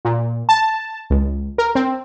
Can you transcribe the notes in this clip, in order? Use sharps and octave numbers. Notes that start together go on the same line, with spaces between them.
A#2
A5
C#2
A#4
C4